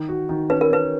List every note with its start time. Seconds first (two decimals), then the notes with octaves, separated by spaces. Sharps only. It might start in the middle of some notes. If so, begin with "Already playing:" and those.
Already playing: D#3
0.09 F#4
0.29 D#3
0.50 C#4 B4
0.61 A#4
0.70 C#4 B4